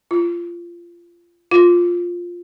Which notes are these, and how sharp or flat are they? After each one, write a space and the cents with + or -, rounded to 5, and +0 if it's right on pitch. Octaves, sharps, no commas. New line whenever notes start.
F4 -20
F4 +5